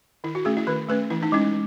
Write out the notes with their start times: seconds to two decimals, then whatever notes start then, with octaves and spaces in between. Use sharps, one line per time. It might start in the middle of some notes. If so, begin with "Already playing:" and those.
0.24 D#3 E4
0.35 F#4
0.45 A3 C#4 G#4
0.57 E4
0.67 D#3 B4
0.89 A3 C#4 B4
1.10 E3 E4
1.23 D#4
1.32 G#3 C#4 E4